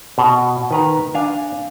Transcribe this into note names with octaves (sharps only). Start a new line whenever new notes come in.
B2
D#3 B4 A#5
D4 F5 G#5